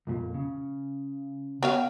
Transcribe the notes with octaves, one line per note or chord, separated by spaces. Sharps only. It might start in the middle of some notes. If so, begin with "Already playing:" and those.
B1 F2 A#2
C#3
B3 C#5 F5 G5